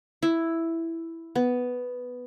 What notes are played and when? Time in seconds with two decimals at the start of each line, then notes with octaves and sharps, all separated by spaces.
0.23 E4
1.35 B3